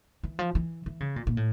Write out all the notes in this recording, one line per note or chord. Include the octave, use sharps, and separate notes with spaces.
E3
F3
E3
E3
C#3
A#2
A#2
A2